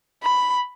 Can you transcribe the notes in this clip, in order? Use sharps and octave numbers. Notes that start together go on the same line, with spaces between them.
B5